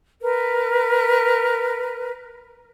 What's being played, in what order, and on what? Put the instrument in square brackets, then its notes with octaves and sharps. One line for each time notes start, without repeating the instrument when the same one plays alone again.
[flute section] A#4 B4